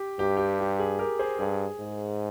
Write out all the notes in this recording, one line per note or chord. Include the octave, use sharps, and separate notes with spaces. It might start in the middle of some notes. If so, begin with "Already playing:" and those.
Already playing: G4
G2 G4
G4
G4
G#4
G4 A#4
G#4 C5
G2 G#4
G#2